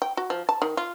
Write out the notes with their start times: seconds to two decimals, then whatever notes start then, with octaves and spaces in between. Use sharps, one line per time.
0.02 G5
0.17 F#4
0.30 F3
0.49 A5
0.62 D#3
0.77 F4